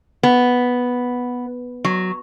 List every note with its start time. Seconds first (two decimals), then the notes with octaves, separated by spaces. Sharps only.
0.23 B3
1.85 F#3